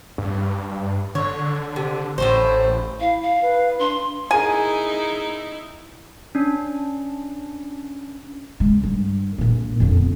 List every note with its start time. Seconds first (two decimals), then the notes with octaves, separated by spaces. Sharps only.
0.18 G2
1.15 D3 C#5
1.76 C3
2.18 A1 A2 A3 C5
3.00 E4 F5
3.22 F5
3.42 B4
3.79 D4 C6
4.31 D#4 E4 G#4 A#4 G#5
6.35 C#4 D4
8.60 C#3 G#3
8.84 G2
9.38 A#1 A#3
9.80 F2 D3
9.97 B3